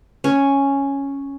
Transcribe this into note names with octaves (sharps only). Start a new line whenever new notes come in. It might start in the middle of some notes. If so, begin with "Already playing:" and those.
C#4